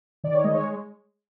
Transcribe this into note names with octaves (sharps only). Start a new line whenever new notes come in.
D#3 D5
C#5
G#3 D#5
C#5